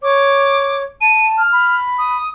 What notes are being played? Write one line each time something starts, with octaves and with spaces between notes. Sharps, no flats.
C#5 D6
A5 D#7
F6
B5
D#6